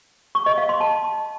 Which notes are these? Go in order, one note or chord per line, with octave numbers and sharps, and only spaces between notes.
C#6
D#5
F5
C6
A5